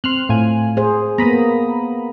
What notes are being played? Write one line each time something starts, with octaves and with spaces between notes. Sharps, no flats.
C4 C6 F6 F#6
A2 F4 G#5
G#4 C5
A#3 B3 A#5 B5 D#6